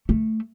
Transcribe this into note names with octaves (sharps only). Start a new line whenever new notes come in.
A3